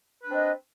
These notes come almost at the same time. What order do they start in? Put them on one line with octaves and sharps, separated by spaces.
B4 D4 C4 D#5